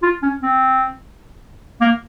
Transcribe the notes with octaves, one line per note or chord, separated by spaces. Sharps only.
F4
C#4
C4
A#3